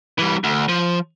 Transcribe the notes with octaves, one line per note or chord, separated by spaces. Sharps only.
E3 G3
D2
F3